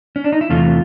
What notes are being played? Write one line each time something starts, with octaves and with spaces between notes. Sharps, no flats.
C#4
D4
D#4
E4
E2 C3 E3 A3 F4